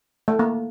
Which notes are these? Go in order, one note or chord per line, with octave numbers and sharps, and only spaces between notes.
A3
A#3